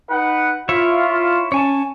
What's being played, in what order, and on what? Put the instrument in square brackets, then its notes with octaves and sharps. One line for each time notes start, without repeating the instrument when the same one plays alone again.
[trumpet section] D#4 B4 F#5
[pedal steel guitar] E4 C#5 E5 [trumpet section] F4
[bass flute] C#4 [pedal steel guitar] C#5 G#5 A5